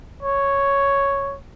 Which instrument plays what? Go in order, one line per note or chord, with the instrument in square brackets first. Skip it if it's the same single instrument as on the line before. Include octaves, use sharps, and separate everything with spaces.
[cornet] C#5